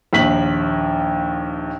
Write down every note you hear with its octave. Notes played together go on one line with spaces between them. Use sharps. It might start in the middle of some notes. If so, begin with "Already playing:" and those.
A#1 D#2 B6 F#7